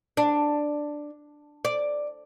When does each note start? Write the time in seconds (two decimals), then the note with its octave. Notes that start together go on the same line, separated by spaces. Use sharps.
0.17 D4
1.65 D5